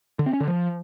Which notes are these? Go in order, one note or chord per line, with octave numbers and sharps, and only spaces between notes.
D3
C4
C#4
D3
F3